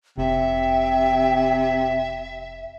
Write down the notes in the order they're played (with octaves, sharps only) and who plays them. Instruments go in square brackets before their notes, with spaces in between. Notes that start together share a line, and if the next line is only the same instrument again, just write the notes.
[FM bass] F1 [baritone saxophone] C3 [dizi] E5 [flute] G5